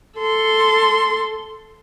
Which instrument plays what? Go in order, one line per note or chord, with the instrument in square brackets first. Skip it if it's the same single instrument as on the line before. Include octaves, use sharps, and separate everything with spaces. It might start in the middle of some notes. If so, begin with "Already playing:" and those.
[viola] A4 C6